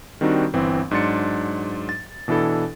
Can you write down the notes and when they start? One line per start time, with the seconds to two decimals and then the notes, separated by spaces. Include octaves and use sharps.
0.21 D#3 G3 C4 D4 D#4 F#4
0.54 G1 E3 C4
0.91 G#2 F#3 D4 C6 A6 C#7
1.89 A6
2.28 B2 E3 D4 E4 A4